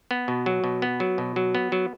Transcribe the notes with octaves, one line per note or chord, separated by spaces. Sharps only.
B3
B2
F#3
B2
B3
F#3
B2
F#3
B3
F#3